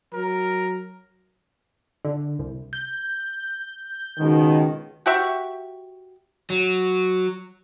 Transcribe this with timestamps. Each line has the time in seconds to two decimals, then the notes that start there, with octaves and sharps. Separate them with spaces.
0.13 F#3 A#4
2.05 D3
2.39 C2
2.73 G6
4.18 C#2 B2 D#3
5.06 F#4 G4 E5 C#6
6.50 F#3